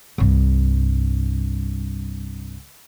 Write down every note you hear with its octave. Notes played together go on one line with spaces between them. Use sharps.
C2 G2